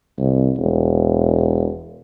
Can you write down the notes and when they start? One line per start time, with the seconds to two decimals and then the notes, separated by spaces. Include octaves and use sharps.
0.18 C2
0.58 E1